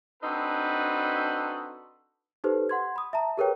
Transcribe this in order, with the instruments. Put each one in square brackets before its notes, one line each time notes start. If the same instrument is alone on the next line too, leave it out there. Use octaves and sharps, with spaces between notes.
[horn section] C4 D4 D#4 F#4 A4 B4
[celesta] D#4 G4 A4 B4 C5
F#5 C6 G#6
B5 D#6
E5 A5 A#5
G4 G#4 A#4 B4 C#5 G5